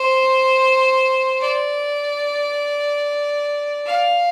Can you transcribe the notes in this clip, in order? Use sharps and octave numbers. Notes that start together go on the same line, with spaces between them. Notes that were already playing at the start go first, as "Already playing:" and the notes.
Already playing: C5
D5
F5